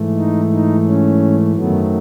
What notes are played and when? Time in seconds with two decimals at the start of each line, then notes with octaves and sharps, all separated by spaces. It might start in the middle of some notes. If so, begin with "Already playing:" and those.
Already playing: G#2 E3 A3
0.16 D#4
0.52 D#4
0.87 C#4
1.56 F#2 D#3 F#3 A3 B3